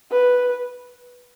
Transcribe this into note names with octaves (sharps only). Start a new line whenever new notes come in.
B4